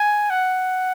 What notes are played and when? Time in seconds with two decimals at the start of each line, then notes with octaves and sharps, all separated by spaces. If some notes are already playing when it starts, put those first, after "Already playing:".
Already playing: G#5
0.30 F#5